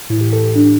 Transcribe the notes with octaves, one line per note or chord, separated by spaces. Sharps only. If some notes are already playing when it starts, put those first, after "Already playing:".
A2 E3 E4
G4
A4
G4
D4